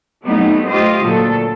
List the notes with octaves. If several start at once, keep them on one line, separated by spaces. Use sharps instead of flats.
F#3 G3 A3 B3 C4 D#4
A3 F4 G4 C5 D#5
D2 A#2 F#3 A4